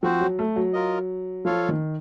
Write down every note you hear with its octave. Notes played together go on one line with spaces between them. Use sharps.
F3 C4 F#4 C5
F#3
A3
F#3
F4 A#4 D#5
F3 F4 A4 C#5 F5
D#3